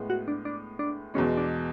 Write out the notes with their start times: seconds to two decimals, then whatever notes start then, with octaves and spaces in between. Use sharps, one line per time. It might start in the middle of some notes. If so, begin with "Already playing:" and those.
Already playing: A2 G#3 B3
0.10 F#4
0.28 D4
0.45 D4
0.79 D4
1.14 E2 B2 G#3 C#4
1.37 D4